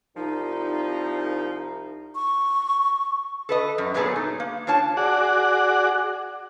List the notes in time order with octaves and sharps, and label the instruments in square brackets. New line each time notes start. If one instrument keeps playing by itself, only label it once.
[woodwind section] C2 F3 D#4
[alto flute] C#6
[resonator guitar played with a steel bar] A4 B4 D#5
F#2
A#2 F#3 B3 G#4 A4 B4
D#4
A#3
D4 F4 C#5 A5
[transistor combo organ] F#4 G#4 D5 F#5